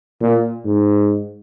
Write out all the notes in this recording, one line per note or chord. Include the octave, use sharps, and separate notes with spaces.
A#2
G#2